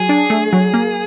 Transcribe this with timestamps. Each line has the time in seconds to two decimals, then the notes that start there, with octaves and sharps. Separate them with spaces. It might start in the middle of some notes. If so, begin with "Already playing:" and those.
Already playing: F#3 G#4
0.09 D4
0.30 A3
0.53 F#3
0.74 A#3